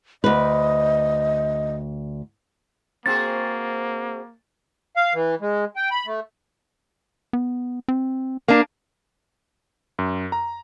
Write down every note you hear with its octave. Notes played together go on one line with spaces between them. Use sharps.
D2 B4 D#5
A#3 C4 F#4 G#4 A6
F5
E3
G#3
G5
B5
A3
B3
C4
A#3 D4
F#2
A#5